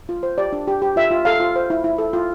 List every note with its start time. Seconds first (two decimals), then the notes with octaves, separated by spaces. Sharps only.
0.09 F4
0.23 C5
0.38 G4 D5
0.53 D4
0.68 G4
0.82 G4
0.96 F4 E5
1.11 F4
1.25 A4 F5
1.40 F4
1.56 C5
1.70 E4
1.84 E4
1.98 A4
2.13 F4